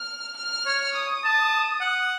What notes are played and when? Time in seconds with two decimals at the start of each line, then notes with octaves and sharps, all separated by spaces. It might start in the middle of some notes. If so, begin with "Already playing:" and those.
Already playing: F6
0.37 F6
0.66 C#5
0.95 D#6
1.24 A5
1.81 F#5